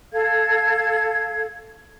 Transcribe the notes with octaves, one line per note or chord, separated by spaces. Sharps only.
A4 F5 G#6